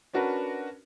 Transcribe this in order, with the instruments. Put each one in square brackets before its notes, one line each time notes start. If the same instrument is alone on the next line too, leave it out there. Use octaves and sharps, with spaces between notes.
[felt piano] C#4 D4 F#4 A#4 B4